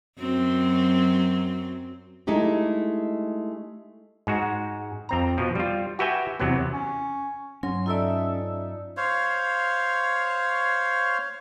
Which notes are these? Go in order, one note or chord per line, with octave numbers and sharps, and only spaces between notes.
F#2 F#3 C4
G#3 A3 D#4 E4 G4
G#2 G#3 F#4
F2 C4 A#5
B2 F3
G3 F4
F#4 G4 B4 E5 G5 G#5
E2 C3 F#3 B3
C#4
G2 F#3 C#4 C6
D#4 F4 A4 D5 E5
C5 C#5 F5